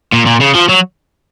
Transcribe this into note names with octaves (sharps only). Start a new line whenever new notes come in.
A#2
A#2
C#3
F3
F#3